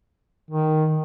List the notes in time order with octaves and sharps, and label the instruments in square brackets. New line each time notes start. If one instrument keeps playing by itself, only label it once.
[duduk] D#3